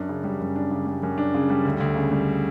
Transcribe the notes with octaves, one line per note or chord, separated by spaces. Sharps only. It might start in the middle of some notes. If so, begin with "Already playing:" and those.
Already playing: F#2 D4
C#3
G3
F#2
D4
C#3
G3
F#2
D4
C#3
G3
D2
D2
C#3
G3